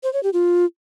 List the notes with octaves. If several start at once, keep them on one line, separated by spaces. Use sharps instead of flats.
C5
C#5
G4
F4